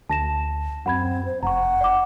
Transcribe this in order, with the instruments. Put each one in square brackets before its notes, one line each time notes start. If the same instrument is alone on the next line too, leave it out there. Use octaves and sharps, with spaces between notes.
[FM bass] D2 [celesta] A5 A#6 E7
[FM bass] F#2 [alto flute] C4 [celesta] F#5 B5 G#6
[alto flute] C5
[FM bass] F1 [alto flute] F#5 [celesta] A#5 C#6
[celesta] D5 D6